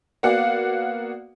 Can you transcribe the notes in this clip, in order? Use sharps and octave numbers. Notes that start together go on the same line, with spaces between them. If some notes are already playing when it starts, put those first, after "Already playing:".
A#3 B3 F#4 D5 F5 F#5